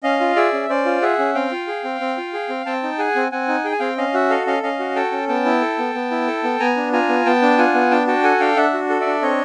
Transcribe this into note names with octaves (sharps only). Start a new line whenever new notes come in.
C#4 D#5 F5
F4
G#4 D5 E5
C#4
C#4 C5 D5
F4
G#4 E5 F#5
C#4
C4 F5 G5
F4
G#4
C4
C4
F4
G#4
C4
C4 G5 A5
D#4
G#4 F#5 G#5
C4
C4 F#5 G#5
D#4
G#4 G5
G#5
C4 F5 G5
C#4 D#5 F5
F#4 E5 F#5
A4 D#5 F5
C#4 D#5 F5
C#4 D#5 F5
F#4
A4 G5 A5
C#4
B3 G5 A5
E4
A4
B3
B3
E4
A4
B3
B3 G#5 A#5
D4
F4 G#5 A#5
B3
B3 G5 A5
D4
F4 F#5 G#5
B3
D4 G5 A5
F#4 G5 A5
A4 F#5 G#5
D4 F5 G5
D4 E5 F#5
F#4
A4
D5 E5
D4
C4 C#5 D#5